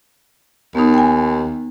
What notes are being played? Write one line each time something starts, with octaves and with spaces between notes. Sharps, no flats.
D#2 B3 D#4
G5 G#5